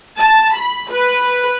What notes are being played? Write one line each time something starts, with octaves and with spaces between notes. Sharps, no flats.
A5
B5
B4